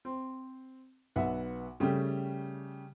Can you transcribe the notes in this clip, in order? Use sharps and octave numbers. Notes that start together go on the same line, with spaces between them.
C4
B1 B3 E5 F#5
C#3 G3 A3 C#4 G4